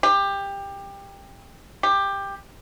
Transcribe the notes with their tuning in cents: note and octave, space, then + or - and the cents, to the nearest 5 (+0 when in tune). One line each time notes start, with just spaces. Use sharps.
G4 +20
G4 +15